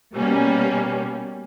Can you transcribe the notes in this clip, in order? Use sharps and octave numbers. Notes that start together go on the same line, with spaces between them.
B2 G3 A#3 C#4